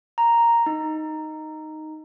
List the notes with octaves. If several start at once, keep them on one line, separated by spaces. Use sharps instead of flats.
A#5
D#4